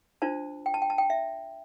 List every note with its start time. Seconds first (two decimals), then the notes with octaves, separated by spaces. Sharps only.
0.22 D4 F4 C5 A5
0.66 G5
0.74 A5
0.82 G5
0.90 A5
0.98 G5
1.10 E5